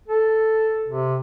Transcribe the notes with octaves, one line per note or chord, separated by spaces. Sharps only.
A4
C3